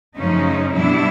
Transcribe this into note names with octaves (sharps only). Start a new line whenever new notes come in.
F#2 C#3 F3 A3 C#4 D#4
B2 G3 B3 D4 E4